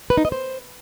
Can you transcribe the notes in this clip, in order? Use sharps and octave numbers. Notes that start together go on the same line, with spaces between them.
B4
D#4
D#5
C5